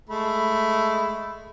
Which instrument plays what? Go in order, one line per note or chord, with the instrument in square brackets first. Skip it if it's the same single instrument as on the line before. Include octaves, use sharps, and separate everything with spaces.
[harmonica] G#3 A3 B5